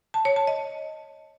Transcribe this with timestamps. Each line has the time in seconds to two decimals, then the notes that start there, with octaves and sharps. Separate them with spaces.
0.14 A5
0.25 C#5
0.36 A5
0.47 D#5